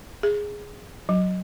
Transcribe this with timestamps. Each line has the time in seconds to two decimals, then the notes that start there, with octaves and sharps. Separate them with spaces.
0.23 G#4
1.09 F#3